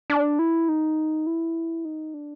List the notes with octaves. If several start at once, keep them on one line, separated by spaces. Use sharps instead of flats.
D4
E4
D#4
E4
D#4
D4